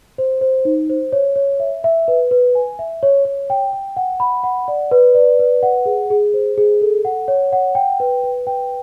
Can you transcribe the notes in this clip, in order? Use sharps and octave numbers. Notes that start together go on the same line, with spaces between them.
C5
C5
D#4
C5
C#5
C#5
E5
E5
B4
B4
G#5
E5
C#5
C#5
G5
G5
F#5
B5
F#5
D5
B4
D5
B4
F#5
G#4
G#4
C5
G#4
A4
F#5
C#5
F#5
G5
B4
B4
G5